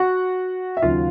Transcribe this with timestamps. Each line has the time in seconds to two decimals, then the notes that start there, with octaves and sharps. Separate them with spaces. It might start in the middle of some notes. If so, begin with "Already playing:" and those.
Already playing: F#4 F#5
0.77 E5
0.82 D#2 C#3 F#3 F4 F5